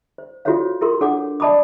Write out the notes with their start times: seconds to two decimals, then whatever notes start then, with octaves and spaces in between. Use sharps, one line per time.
0.18 C5
0.45 F4 F#4 A4 C5 C#5 F5
0.81 F4 G4 A4 A#4 C6
1.01 D4 A4 C#5 F#5 D6
1.40 D5 D#5 A5 B5 D6 D#6